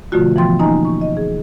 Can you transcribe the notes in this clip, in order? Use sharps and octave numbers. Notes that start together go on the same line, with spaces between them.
B2 D3 F3 A3 F4 F#4
E3 F3 B3 G5 C6 A6
A#3 C#4 D#4 D#5 G#5 A#5
C#6
D#5
G#4